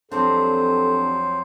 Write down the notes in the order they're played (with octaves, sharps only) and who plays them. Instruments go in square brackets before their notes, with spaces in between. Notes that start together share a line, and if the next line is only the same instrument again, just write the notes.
[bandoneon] F2 F#3 C5 [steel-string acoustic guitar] G3 C4 D4 [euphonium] A4